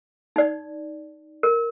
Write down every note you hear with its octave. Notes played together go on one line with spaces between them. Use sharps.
D#4 D5
A#4